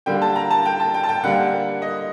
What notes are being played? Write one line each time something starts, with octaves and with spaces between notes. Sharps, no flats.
D3 G3 A#3 G5
A5
A#5
A5
G5
A5
G5
A5
G5
D3 G3 A#3 F#5
D#5